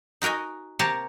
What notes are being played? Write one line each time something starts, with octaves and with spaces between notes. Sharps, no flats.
D#4 F#4 A#4 D#5 G#5
C3 A#3 G4 A#4 C#5 A5